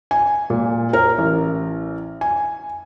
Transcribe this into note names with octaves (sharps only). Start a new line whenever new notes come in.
G#5
A#2
A#4
A1
G#5